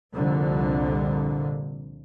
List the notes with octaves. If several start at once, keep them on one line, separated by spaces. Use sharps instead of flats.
C2 F2 A#2 D3